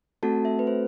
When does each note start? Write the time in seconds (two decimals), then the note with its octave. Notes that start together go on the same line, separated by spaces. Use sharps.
0.23 A3 C4 F#4 A4 A5
0.45 E5
0.59 B4
0.67 C5